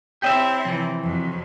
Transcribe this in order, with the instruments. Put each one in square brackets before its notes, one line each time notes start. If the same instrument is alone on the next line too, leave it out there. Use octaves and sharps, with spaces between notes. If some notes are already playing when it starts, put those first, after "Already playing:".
[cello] C4 E4 [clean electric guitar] G4 D#5 E5 [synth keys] C#5 G5 G6
[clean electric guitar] C3 E3 [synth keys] F3
[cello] F2 F#3